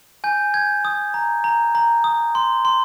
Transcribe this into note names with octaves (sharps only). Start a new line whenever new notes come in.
G#5 G6
G6 G#6
D#6
A#5
A#5
A#5
D#6
C6
C6